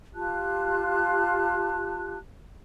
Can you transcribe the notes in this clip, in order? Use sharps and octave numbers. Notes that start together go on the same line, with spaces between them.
F4 G4 A5 F#6